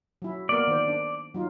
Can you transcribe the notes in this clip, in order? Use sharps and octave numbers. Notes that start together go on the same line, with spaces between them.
F#3 E4
A#3 B3 A#4 D5
D#3 C5
D4
F#3 D#4 F4